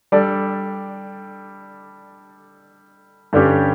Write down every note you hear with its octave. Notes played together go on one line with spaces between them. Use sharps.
G3 D4 A4 D5
G2 D3 G3 C#4 G4